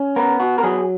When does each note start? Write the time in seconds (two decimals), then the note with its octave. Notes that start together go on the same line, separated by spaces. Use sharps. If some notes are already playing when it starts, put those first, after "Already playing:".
Already playing: C#4
0.16 B3 A#4
0.40 F#4
0.58 A#4
0.63 F#3 G#4